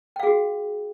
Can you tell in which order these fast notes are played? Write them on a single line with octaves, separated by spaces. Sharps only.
G5 F5 G#4 F#4